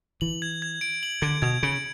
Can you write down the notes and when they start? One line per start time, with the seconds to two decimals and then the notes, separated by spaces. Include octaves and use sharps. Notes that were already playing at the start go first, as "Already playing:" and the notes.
0.21 E3 F#7
0.42 G#6
0.62 G#6
0.81 D7
1.03 F#7
1.22 D3 G#6
1.42 B2 G#6
1.63 C#3 D7